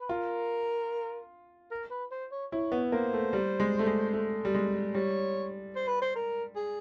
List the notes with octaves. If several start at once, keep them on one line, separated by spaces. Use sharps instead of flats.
B4
F4 A#4
A#4
B4
C5
C#5
E4 C#5
B3
A#3 C5
A3
G3
G#3
A3
G#3
A3
G3
G#3
G3 C#5
C5
B4
C5
A#4
G#4